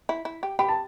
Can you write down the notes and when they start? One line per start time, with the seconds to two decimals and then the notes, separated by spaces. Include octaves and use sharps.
0.09 E4
0.25 E4
0.43 G4
0.59 G4 B5
0.68 A5